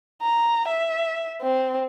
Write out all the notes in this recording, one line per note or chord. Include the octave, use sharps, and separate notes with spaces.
A#5
E5
C4